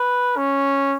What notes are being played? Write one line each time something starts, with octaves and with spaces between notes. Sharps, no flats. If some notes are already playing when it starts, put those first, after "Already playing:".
Already playing: B4
C#4